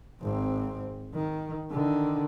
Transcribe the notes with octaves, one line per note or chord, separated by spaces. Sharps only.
G#1 C4
D#3
D3 D#3